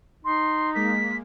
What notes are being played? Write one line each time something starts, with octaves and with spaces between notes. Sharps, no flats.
D#4 C6
G#3 A#3 B6